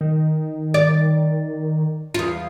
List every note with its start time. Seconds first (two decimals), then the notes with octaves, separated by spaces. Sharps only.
0.01 D#3
0.74 D5
2.14 E2 F4